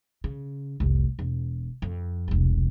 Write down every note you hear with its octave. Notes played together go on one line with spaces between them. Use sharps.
C#3
F1 C2
E1
F2
E1 C2